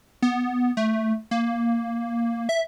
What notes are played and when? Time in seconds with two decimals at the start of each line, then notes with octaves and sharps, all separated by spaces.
0.22 B3
0.77 A3
1.31 A#3
2.49 E5